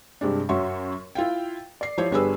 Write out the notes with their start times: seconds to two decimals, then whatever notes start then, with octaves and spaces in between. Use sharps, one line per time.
0.21 G2 C3 G#3 D4
0.49 F#2 C#4 F#4 E5 C6 C#6
1.15 E4 F4 F5 G5
1.81 D5 C7
1.98 F3 E4 G4 C5 C#5
2.11 G1 G3 D4 G#4 B4 E6